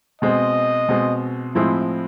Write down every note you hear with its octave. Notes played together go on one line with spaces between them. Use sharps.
B2 G#3 C4 D#5
B2 G#3 C4
A2 F3 G#3 C4 E4 E5